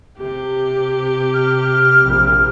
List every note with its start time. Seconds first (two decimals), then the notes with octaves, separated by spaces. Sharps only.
0.19 C3 G4
1.34 F6
2.04 A#1